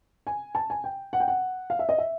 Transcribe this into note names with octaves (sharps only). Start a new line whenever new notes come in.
G#5
A5
G#5
G5
F#5
G5
F#5
F5
E5
D#5
E5